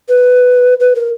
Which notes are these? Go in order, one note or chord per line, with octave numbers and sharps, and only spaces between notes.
B4
B4
A#4